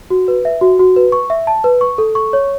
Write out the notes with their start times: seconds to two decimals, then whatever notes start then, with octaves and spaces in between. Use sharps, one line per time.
0.10 F#4
0.28 B4
0.45 E5
0.61 F#4
0.79 F#4
0.96 B4
1.12 C#6
1.30 E5
1.47 A5
1.64 B4
1.81 C#6
1.98 A4
2.15 C#6
2.33 C#5